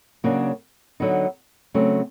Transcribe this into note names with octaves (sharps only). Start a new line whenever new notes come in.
C#3 F#3 A#3 D4 F#4
D3 F#3 B3 D#4
C#3 F#3 A3 C4